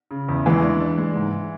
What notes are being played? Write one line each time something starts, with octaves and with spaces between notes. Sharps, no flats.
C#3
E2
E3 G#3
D4
D4
G#3
G#2